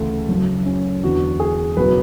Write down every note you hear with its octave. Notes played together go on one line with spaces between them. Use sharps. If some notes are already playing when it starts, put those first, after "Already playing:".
Already playing: D2 C#3 E3 A3
F#1 F#2 C#3
C#4
E2 D3 F#3 F#4
G#4
F#1 B2 F#3 B4